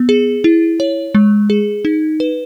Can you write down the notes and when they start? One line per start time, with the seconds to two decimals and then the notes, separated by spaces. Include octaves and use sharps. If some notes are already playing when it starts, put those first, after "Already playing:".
Already playing: B3
0.09 G#4
0.44 E4
0.80 C#5
1.15 G#3
1.50 G#4
1.85 D#4
2.20 B4